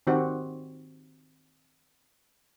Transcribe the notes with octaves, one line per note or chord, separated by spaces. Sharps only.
D#3 C4 F#4 G4